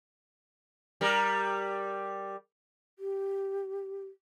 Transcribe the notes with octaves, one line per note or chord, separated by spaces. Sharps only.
G3 A#4
G4